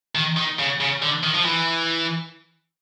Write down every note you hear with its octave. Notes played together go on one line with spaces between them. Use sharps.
D#3
D#3
C#3
C#3
D3
D#3
F3
E3